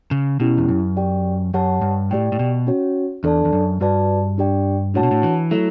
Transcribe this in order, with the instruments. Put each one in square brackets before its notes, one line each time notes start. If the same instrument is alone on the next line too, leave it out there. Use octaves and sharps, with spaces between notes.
[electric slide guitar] C#3
[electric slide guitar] B2 [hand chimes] C#4 E4 G4
[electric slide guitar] E2
F#2
[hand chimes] G4 D5 G5
[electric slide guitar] F#2 [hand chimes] G4 C#5 F#5 A5
[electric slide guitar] G2
[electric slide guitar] A2 [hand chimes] G4 D5 G5
[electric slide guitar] A2
B2
[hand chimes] C#4 F#4 C#5
[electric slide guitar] E2 [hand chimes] D4 A4 D5 A5
[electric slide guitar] E2
F#2
[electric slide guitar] G2 [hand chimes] F#4 B4 D5 A5
[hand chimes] D4 G4 D5 G5
[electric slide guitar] A2 [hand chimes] D4 F#4 C#5 F#5 A5
[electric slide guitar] B2
A2
E3
[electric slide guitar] F#3 [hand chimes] A3 E4 A4 E5